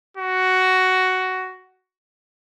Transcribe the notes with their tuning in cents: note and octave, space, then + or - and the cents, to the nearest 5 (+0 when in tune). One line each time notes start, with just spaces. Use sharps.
F#4 +10